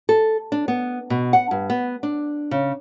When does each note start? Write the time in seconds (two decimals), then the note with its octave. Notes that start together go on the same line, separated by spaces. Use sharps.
0.09 A4
0.52 D4
0.68 B3
1.10 B2
1.33 F#5
1.51 G2
1.70 B3
2.03 D4
2.51 C#3